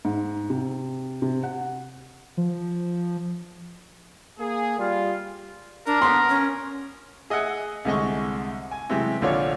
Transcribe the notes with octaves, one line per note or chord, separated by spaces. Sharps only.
G#2
C3
C3
F#5
F3
A#3 G#4
G3 F4
D4 A#4
B3 C6
C#4
G#4 D#5 E5 F#5 G#5
C2 D3 G#3 D#5 C#6
G#5
C3 E3 F#3 G#3 G4
A#1 D3 D4 F4 C#5